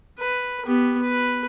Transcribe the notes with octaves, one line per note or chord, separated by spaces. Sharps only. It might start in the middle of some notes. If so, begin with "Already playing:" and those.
B4
B3 G4
B4